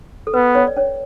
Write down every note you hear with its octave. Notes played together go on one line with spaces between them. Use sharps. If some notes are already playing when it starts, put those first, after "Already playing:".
A4
B3 B4
C#4 C#5
D5
C#4 C#5